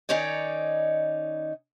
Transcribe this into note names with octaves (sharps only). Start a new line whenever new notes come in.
D#3 C#4 D#4 C#5 D5